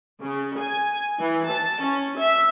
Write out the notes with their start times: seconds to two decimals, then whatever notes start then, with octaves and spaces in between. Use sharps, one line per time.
0.22 C#3
0.60 G#5
1.19 E3
1.51 A5
1.84 C#4
2.19 E5